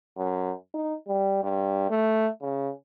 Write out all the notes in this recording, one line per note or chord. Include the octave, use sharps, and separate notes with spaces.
F#2
D#4
G3
G2
A3
C#3